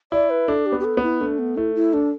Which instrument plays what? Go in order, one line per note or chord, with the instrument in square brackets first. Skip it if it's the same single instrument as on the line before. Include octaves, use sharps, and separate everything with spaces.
[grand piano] E4 [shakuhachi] D5
[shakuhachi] B4
[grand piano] D4 [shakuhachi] A4
[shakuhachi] G4
[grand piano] B3
[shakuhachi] G4
A4
[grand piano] B3
[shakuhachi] E4
[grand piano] A3 [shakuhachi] D4
[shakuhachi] B3
[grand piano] A3 [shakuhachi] E4
[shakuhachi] E4
[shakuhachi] D4 [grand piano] A4